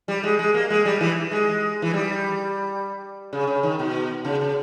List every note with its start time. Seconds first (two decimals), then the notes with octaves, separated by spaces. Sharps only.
0.08 G3
0.23 G#3
0.39 G#3
0.54 A#3
0.70 G#3
0.85 G3
1.01 E3
1.31 G#3
1.82 E3
1.94 G3
3.33 C#3
3.47 C#3
3.63 D#3
3.79 B2
4.25 C#3
4.41 C#3